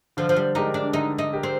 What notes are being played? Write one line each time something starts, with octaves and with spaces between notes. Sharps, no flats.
D3 F3
F3
G3
G#3 D4 D#4 G4 A#4
D4
D3 D#4
D#4
G#3 D4 G4 A#4
C4